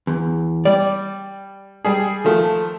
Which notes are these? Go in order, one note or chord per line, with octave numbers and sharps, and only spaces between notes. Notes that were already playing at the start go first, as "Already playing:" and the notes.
E2
G3 D5
G3 G#4
D#3 F3 A3